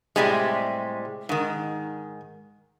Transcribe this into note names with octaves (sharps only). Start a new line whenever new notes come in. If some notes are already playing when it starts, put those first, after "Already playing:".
A2 C3 G3 G#3
G#2 D#3